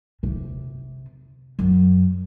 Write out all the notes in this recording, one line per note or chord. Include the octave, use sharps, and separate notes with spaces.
C3
F#2